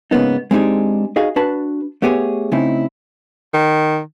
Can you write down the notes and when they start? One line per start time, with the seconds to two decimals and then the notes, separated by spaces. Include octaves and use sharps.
0.11 G#2 C#3 A#3 B3 D#4
0.51 G#3 C4 D4 D#4 G4 G#4
1.16 D#4 F#4 G#4 D#5 F5
1.36 D4 F#4 B4 A5
2.02 A3 B3 G4 G#4 C#5
2.52 C#3 A3 C4 D#4 E4
3.53 D#3